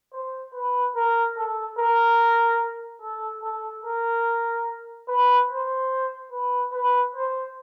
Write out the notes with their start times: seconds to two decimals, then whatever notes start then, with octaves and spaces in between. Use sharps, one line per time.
0.13 C5
0.54 B4
0.96 A#4
1.37 A4
1.78 A#4
3.02 A4
3.43 A4
3.84 A#4
5.08 B4
5.50 C5
6.31 B4
6.73 B4
7.15 C5